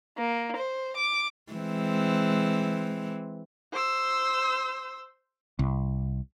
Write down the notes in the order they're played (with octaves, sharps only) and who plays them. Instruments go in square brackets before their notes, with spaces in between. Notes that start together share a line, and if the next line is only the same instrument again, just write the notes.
[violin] A#3
C5
D6
[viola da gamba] E3 G#3 C4
[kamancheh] C5 E6
[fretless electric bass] C2